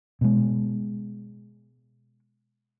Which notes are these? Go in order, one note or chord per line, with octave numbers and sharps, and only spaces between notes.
B2 G#3